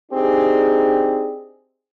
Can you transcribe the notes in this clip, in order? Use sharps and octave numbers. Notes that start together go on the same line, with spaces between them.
C4 D4 D#4 G4 G#4